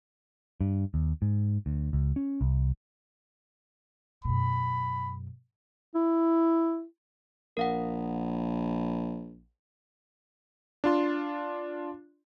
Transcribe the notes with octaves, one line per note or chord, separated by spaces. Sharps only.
G2
D#2
G#2
D2
C#2
C#4
C2
F#2 B2 B5
E4
A#1 A#4 F5 F#5
D4 F4 C6